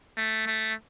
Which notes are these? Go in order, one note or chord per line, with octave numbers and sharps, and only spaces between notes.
A3
A3